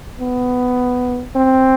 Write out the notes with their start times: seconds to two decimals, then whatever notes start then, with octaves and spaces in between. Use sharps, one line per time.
0.20 B3
1.35 C4